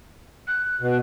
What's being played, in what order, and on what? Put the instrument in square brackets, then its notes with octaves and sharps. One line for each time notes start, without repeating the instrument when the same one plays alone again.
[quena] F#6
[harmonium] B2